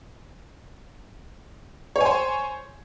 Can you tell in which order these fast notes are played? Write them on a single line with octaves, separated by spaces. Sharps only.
C#5 G#5 C5